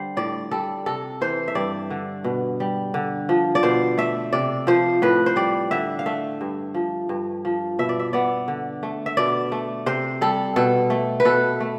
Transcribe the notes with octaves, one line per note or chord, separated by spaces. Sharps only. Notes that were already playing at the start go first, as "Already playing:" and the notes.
Already playing: D3 G3 C5
A2 D5
G3 A4
C3 A4
E3 C5
E5
G2 D5
D3
B2
G3
D3
F3
D5
B2 C5
A3 E5
C3 D5
F3 C5
A2 B4
C5
G3 D5
D3 E5
F5
A3 E5
G2
F3
G2
F3
B2 E5
D5
E5
B3 D5
D3
A3
E5
B2 D5
A3
C3 C5
G3 A4
B2 A4
A3
B4
B2 A4
A3